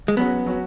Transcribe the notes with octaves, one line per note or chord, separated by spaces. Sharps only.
G#3
F#3 B3 C#4 F#4
F#3 C#4 F#4